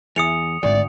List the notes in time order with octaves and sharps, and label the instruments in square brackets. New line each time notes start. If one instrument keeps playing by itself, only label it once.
[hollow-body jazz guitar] E2 [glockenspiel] D#6 C#7 F7
[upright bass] G#1 [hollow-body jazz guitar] D2 [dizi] D5